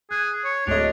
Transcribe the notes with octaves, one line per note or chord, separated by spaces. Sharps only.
G#4 F#6
C#5
D1 D4 A4 C#5 D#5 F7